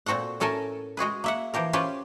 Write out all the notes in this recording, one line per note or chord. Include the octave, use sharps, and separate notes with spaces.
A#2 C4 F#4 A4 F#5
A2 C#4 A4 A#4 G#5 A5
G#3 F#4 G#4 B4
A#3 E5 F#5
E3 F3 G4 A#4
C#4 F4 G4 B4 C5